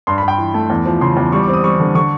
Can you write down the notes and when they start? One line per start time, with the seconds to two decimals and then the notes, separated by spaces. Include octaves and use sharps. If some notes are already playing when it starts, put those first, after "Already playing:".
0.07 G2 C6
0.18 B5
0.23 G2
0.28 G5
0.38 E3
0.54 A3
0.70 E2
0.86 F3
1.01 C#3 C6
1.17 E2
1.32 G3 C#6
1.43 D6
1.48 C4
1.53 D#6
1.64 G3 C#6
1.80 D3
1.95 D3 C#6